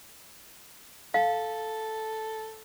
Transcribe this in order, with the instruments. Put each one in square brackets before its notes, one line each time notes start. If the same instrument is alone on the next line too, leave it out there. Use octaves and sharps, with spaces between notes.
[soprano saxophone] A4 [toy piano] F5